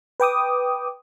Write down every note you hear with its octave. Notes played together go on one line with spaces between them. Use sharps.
B4 G5 D6 D#6